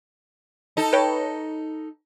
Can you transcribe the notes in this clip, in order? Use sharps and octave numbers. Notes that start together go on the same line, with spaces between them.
D#4 A4
B4 C#5 G5